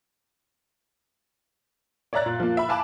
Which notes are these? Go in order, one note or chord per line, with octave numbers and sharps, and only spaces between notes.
C#5 D5 E5 A#5 F#6 A6
A#2
F3 A#3
E5 B5
F5 G#5 A5 B5 D6 F#6